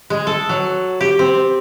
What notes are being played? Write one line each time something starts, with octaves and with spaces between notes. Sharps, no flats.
G#3
A4
F#3
G4
C4